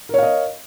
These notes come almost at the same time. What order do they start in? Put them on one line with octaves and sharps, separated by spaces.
A#4 C#5 F5 D#5